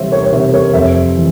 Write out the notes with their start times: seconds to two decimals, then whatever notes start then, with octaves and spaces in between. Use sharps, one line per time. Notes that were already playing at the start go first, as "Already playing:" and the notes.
Already playing: C3 E3 G3 C5 C#5 E5
0.12 A#4 C#5
0.25 C#5
0.32 C3 C5 E5
0.54 A#4 C#5
0.73 F2 C5 E5
1.16 E3